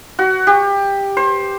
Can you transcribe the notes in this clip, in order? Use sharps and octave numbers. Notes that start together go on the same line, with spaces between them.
F#4
G4
C5